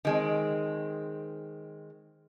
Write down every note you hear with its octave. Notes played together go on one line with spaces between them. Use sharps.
D#3 G#3 C4